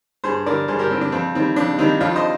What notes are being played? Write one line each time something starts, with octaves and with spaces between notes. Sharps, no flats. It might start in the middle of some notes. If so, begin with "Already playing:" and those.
G2 G#4 C5
D3 G3 A#4 D5
G2 G#4 C5
G4 A#4
D3 G3 C4
D4
F2 C4
D#3 G3 C4
F2 D4
D#3 G3 C4 D#4
F2 D4 F4
C5 D#5